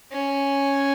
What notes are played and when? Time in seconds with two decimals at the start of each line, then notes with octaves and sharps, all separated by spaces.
0.12 C#4